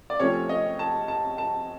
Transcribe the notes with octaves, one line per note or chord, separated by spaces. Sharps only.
D5
C3 F3 A3 C#4 C#5
D#5
A5
A5
A5